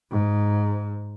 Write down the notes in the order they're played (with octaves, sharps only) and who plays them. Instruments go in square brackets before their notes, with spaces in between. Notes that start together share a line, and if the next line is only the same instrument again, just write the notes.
[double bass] G#2